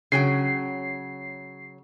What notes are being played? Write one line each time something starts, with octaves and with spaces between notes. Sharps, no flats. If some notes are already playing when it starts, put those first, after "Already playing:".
C#3 F#3 G5 C7